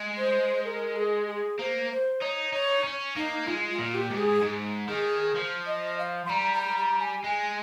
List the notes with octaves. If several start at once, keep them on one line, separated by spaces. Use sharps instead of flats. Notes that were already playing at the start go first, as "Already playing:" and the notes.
Already playing: G#3
C5
A#4
G#4
G#4
A#3 C5
C5
D#4 C#5
D#4 C#5
C#4
A#3 D#4
G#3 F4
F4
A#2
G4
G#2
G#4
G#2
D#3 G#4
F3
D#5
F5
C6
G3 A#5
A#5
A#5
G#5
G#3 G#5